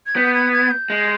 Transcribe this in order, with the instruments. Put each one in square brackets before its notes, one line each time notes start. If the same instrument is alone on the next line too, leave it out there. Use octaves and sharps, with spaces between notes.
[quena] G#6
[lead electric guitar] B3 [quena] G6
[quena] G#6
G#6
G6
[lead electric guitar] G#3